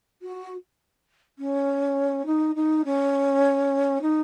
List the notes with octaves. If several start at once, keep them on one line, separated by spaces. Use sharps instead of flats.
F#4
C#4
D#4
D#4
C#4
D#4